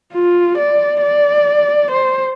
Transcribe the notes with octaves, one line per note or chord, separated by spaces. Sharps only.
F4
D5
D5
C5